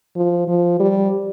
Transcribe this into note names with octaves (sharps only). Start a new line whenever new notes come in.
F3
F3
G3